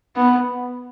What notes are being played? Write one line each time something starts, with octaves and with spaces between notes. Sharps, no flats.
B3